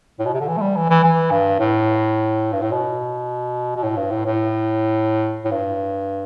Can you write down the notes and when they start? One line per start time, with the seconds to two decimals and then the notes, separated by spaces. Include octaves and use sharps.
0.19 A2
0.26 B2
0.34 C3
0.40 D3
0.48 E3
0.57 A3
0.61 G3
0.76 E3
0.89 E3
1.03 E3
1.31 G2
1.59 A2
2.52 G2
2.62 A2
2.72 B2
3.76 B2
3.83 A2
3.97 G2
4.11 A2
4.26 A2
5.45 A2
5.51 G2